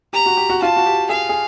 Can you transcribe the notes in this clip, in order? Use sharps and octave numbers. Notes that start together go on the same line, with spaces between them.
G4 A#5
F#4
G4
F#4
F4 A5
F#4
G4
G#4 F5
G#4